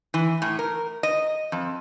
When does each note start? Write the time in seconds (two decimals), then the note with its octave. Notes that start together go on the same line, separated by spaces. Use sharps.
0.14 E3
0.42 A2
0.59 A#4
1.03 D#5
1.52 F2